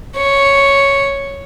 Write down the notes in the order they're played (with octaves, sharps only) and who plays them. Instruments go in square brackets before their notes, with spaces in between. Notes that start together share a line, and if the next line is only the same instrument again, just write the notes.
[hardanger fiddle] C#5